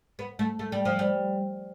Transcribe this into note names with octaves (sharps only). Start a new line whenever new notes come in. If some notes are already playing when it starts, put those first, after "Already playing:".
B3
A3
A3
G3
F3
G3